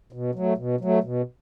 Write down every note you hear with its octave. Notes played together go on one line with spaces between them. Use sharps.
B2
F#3 A3
B2
F#3 A3
B2